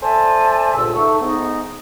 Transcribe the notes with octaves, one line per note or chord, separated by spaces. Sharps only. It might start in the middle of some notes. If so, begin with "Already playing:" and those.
A4 C5 D5 E5 G#5 A5
C#2 G2 A#2 D3 E6
A3 D#4 C#6
G#2 B3 D#4